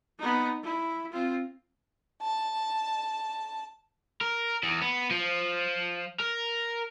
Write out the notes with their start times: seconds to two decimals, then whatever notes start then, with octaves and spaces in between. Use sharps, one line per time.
0.19 B3 D#4
0.63 E4
1.12 C4 F4
2.22 A5
4.21 A#4
4.63 E2
4.81 B3
5.11 F3
6.20 A#4